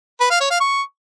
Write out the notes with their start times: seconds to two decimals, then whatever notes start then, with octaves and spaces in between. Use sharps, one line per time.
0.20 B4
0.30 F5
0.40 C#5
0.50 F5
0.60 C#6